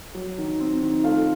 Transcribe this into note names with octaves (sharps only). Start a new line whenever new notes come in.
F#3
D#3
C4
D#3
A3 F4 F5